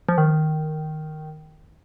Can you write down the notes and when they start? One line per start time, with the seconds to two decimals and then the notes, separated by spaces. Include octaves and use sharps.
0.09 F3
0.18 D#3